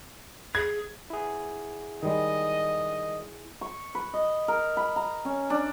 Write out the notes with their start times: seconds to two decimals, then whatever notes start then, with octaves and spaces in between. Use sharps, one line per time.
0.55 G#4 G#6
1.10 E4 G#4
2.03 D#3 G3 G#3 D#5
3.61 C#6
3.95 B4
4.14 D#5
4.48 A#4
4.77 B5
4.96 A#5
5.25 C#4
5.50 D4